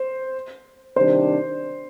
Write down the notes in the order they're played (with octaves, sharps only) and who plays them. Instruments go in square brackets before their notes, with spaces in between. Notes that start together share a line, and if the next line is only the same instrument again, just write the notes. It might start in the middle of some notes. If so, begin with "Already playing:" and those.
Already playing: [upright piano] C5
[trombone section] C3 D#3 G3 D4 [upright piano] C5